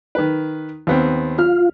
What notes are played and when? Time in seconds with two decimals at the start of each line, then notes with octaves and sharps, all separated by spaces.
0.15 D#3 B4
0.87 D#2 B3 C4
1.39 F4 F6